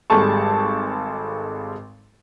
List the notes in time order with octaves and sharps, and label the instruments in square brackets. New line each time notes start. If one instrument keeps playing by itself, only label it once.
[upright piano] G#1 G3 G#3 A4 A5 C#6